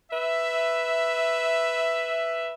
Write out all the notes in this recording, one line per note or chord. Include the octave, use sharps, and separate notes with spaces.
B4 E5